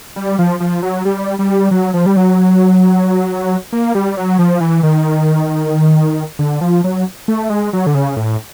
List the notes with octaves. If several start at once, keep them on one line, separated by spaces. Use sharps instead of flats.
G3
F3
F3
F#3
G3
G3
F#3
F3
G3
F#3
A#3
G3
F#3
F3
E3
D#3
D3
F3
F#3
A3
G#3
F#3
D3
C#3
A2